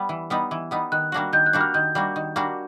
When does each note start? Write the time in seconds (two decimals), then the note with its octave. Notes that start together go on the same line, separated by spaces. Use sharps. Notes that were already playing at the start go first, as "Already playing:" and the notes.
Already playing: G3 B3
0.09 E3
0.30 G3 B3 D#4
0.51 E3
0.71 G3 B3 D#4
0.92 D#3 F#6
1.12 G3 A#3 D4 F#4
1.33 D#3 G6
1.46 F#6
1.53 G3 A#3 D4 F#4
1.61 F6
1.74 D#3 G6
1.95 G3 A#3 D4 F#4
2.16 D#3
2.36 G3 A#3 D4 F#4